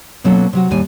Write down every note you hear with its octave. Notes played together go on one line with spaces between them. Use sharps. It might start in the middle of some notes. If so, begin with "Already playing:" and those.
B2 F#3 A#3 C#4 F4 A4
C3 F#3 F#4
D#2 A2 G3 G#5